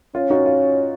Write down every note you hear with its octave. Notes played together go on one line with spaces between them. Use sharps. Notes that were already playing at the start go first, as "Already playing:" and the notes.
C#4 F4
D#4 F#4
F4